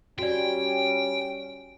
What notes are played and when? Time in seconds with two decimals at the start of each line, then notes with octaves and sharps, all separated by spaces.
0.19 G3 C#4 F#4 D5 G5